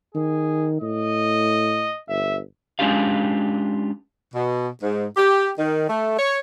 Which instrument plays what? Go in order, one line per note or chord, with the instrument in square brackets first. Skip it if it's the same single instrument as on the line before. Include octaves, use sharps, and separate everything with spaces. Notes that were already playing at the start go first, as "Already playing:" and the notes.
[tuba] D#3 [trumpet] G#4
[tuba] A2 [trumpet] D#5
[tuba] G1 [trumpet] E5
[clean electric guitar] G#3 C#4 D4 F4 G4 F5
[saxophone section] B2
G#2
G4
D#3
A3
C#5